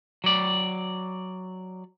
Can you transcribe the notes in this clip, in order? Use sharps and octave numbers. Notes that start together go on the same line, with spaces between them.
F#3 D5